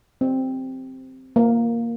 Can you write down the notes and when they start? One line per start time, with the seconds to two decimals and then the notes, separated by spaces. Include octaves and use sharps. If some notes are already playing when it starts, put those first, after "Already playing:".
0.21 C4
1.36 A#3